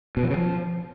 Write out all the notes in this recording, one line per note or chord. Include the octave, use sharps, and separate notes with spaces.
B2
F3
C#3
F3